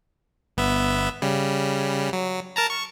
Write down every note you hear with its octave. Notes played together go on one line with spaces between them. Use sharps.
G1 B3 E5
C#3 G3
F#3
A#4 A5 A#5
C#6